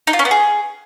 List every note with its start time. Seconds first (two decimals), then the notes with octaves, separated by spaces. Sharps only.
0.07 D#4
0.13 F4
0.19 C#4
0.25 B3
0.31 G#4